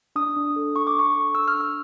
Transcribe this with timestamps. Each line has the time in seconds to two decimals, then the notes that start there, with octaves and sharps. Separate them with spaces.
0.16 D4 D#6
0.36 D4
0.56 A4
0.76 D4 C#6
0.87 D6
0.95 D4 C#6
1.15 A4
1.35 D4 E6
1.48 F6
1.54 D4
1.60 E6